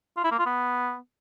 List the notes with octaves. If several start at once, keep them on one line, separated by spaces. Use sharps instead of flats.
F4
E4
A#3
F4
B3